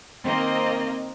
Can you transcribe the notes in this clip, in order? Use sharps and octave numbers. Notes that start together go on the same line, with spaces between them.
D#3 A#3 C4 D#5